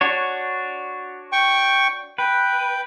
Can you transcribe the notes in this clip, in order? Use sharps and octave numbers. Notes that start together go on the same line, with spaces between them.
D4 F#4 C#5
G5 C#6
B4 G5